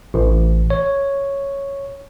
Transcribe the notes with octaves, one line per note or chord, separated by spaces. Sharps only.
A1
C#5